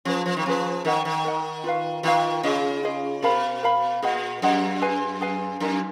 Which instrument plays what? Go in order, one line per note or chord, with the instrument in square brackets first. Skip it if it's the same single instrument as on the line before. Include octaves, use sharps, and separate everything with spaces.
[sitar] F3 [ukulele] C#4 G#4 B4
[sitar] F3
D#3
[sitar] F3 [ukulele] C#4 G#4 B4
[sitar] D#3 [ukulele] A#4 D#5 F#5
[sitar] D#3
[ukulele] A#4 D#5 F#5
F4 B4 F5
[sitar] D#3 [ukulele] F4 B4 F5
[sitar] C#3 [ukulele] F4 G#4 D#5
[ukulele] F4 G#4 D#5
[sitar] B2 [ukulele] A#4 F5 B5
[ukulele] A#4 F5 B5
[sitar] A#2 [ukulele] G#4 D#5 F#5
[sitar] F#2 [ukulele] G#4 D#5 F#5
[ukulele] G#4 B4 F5 G#5
G#4 B4 F5 G#5
[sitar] F#2 [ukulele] D#4 A#4 D#5 G#5